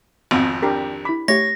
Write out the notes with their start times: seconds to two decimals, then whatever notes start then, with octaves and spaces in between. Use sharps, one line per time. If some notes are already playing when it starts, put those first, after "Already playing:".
0.31 G#1 F2 B3
0.62 D4 G4 A#4
1.05 E4 B5 D6
1.28 A3 G4 C#5 A#6